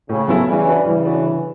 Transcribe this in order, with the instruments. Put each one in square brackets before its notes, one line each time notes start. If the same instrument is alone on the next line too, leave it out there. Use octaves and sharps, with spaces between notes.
[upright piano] A2 [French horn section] C#3
[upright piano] F#3 B3 E4 A4
[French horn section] C#3 E3 [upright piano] G3
[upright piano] D4 F#4 B4 D5
[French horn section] C#3 E3 [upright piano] G3
[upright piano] D4 F#4 B4 D5
D3